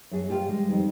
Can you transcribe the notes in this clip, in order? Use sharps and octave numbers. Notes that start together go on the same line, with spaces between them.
F#2 G#4 C#5
F4 G4 C5 E5 F5
G3 G#3
F2 D#3